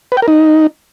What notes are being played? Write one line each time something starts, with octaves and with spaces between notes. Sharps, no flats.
B4
G5
A#4
D#4